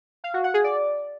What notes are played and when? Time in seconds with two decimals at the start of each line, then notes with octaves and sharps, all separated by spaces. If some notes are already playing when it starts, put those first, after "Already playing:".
0.24 F5
0.34 F#4
0.44 F#5
0.54 G#4
0.64 D5